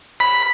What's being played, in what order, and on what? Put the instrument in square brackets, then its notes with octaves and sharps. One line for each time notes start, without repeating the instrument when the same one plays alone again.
[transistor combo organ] B5